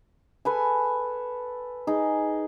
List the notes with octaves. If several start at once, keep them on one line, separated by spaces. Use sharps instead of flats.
A4 B4 G#5
D#4 G#4